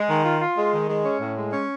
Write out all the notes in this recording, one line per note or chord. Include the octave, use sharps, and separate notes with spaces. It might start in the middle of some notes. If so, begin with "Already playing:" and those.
Already playing: G#3
D#3
F4
F4
G#3
D#3
G#3
C#4
A2
G#3
C#4